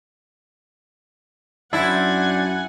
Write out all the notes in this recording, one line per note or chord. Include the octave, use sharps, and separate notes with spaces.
F#2 D4 E4 C5 F#5 G#5